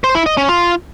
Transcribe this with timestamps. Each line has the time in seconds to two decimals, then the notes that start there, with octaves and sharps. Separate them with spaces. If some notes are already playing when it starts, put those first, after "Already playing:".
0.04 C5
0.15 E4
0.26 D#5
0.37 C#4
0.49 F4